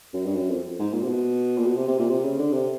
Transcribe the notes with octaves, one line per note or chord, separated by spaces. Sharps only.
F#2
G2
F#2
F2
G#2
A#2
C3
B2
A#2
B2
C3
C3
A#2
C3
C#3
D3
C3